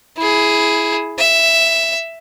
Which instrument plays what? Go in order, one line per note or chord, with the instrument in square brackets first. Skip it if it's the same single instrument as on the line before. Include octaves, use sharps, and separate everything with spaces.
[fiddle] E4 G#4
E5